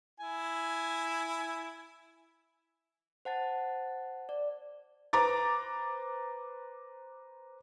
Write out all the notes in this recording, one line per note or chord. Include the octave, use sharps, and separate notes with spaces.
E4 G#5
C5 F#5 A5 A6
D5
B4 C5 A#5 D6 A6